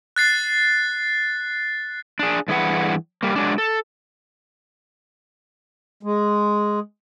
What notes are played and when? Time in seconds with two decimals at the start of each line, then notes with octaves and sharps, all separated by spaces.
0.16 F#6 A6 C7
2.19 D4 G#4
2.48 G2 E3 G#4 B4 F#5
3.23 G3 A#3
3.36 F#3 G#3 D4
3.58 A4
6.03 G#3